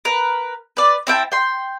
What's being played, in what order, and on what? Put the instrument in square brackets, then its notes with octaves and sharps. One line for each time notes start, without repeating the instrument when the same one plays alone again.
[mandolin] A#4 B4
B4 D5
C4 E4 G5 A5
G5 C6